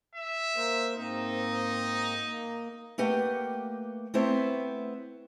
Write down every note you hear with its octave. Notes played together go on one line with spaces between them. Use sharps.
E5
A#3 A#4 C5
G#2 A#3 C4 D#4
A#3
A3 A#3 G4 B4 F#5 G5
A3 B3 C4 E4 C5 E5